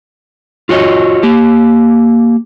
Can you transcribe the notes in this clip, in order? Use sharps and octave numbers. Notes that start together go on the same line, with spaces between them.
F4 F#4 C#5 D#5
A#3 G4